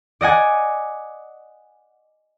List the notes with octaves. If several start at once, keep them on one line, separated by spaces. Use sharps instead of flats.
D5 D#5 F#5 G#5